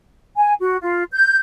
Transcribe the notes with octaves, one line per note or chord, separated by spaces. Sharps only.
G#5
F#4
F4
G6